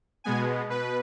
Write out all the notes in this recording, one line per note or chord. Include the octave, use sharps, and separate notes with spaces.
B2 G#3 B3 G#5
B2 B4